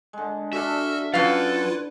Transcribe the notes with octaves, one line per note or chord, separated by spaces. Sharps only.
D3 G#3
D3 D4 F#4 A4 E5 F6
F#2 E4 F4 A4 B4 F5